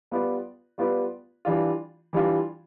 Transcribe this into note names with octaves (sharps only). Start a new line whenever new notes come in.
G3 B3 F4 B4 D5
G3 B3 F4 B4 D5
E3 G3 D4 F4
E3 G3 D4 F4